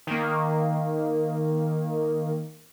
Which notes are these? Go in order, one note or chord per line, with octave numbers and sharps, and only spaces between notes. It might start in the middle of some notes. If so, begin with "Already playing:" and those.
D#3 A#3